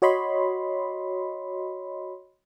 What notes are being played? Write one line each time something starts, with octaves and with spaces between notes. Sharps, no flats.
F#4 C#5 D#5 B5 C6